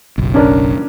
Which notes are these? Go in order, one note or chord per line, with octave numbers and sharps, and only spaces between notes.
F#1 B1
C#4 D4 A#4